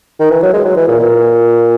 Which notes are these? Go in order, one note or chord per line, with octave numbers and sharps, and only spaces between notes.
D#3
E3
F#3
G#3
F#3
E3
A#2
A#2